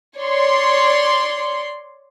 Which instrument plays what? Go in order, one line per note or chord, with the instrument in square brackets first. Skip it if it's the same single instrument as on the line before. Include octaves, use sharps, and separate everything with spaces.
[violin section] C#5 D5 C6